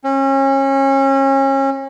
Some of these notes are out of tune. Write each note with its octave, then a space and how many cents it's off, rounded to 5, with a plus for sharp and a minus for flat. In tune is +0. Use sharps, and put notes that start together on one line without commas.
C#4 -30